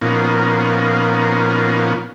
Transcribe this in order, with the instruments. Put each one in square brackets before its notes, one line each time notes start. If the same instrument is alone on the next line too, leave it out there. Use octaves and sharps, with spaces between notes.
[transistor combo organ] A#2 F3 A#3 B3 C#4 D#4